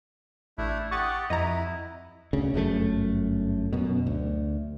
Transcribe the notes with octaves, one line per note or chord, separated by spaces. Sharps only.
A1 A3 D4 E4
G4 F#5 C#6 D#6 A6
F2 E4 D#5 A#5
D2 C#3
G1 F#2 C#3 A3
F#2 B2
D2